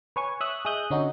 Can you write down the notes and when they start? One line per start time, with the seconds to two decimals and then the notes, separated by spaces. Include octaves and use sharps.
0.16 B4 C#5 G#5 C#6
0.40 C#5 E5 D#6 F#6
0.65 G#4 D#5 E5 D#6 F#6 G6
0.90 D3 C#4 D#4 F#4